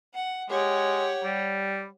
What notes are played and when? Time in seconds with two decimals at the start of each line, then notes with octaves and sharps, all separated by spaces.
0.14 F#5
0.50 G#3 G4 C#5 F#5
1.24 G3